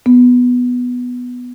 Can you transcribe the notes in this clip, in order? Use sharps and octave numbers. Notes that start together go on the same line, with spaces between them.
B3